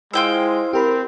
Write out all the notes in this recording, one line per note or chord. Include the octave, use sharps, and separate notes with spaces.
G#3 E4 F4 C5 G5 E6
C4 G4 A#4 B5